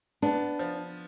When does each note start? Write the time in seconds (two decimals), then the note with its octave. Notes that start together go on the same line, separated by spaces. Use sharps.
0.22 B3 D4
0.59 F3